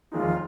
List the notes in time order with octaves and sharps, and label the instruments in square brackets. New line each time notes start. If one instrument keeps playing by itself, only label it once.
[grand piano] F1 D#2 D#3 G#3 D#4 [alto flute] F4